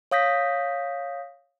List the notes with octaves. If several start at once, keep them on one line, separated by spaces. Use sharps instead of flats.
C#5 F5 D#6 G6 A#6 B6